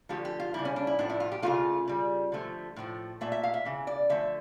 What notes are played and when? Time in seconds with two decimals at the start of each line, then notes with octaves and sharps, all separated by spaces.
0.09 D3 F3 A3 G4
0.25 G4
0.40 F4
0.54 C#3 E3 G3 E4
0.65 C#4
0.76 D4
0.87 E4
0.99 A2 F3 A3 D4
1.10 E4
1.20 F4
1.32 G4
1.42 C#3 E3 A3 F4
1.88 C#3 G3
2.32 D3 F3 A3
2.76 A2 F3 A3
3.21 A#2 A3 E5
3.32 E5
3.43 F5
3.54 E5
3.65 C#3 E3
3.87 D5
4.10 D3 F3 A3 E5